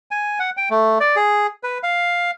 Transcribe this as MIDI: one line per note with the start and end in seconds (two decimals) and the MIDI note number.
0.11 0.39 80
0.39 0.50 78
0.57 0.69 79
0.70 0.98 57
1.00 1.16 74
1.16 1.47 68
1.63 1.78 71
1.83 2.31 77